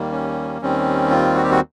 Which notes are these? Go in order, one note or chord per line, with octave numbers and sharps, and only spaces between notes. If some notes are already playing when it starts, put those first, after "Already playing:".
Already playing: D#2 D#3 G3 A#3
C#4
D#2 D#3 G3 C4 C#4
F4
F#4
G4
F#4